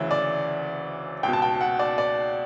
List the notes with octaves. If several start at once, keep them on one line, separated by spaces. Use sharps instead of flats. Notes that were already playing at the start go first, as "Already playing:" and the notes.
Already playing: D2 C#3 E3 E5
D5
C#2 B2 G5
A5
G5
F#5
D5
D5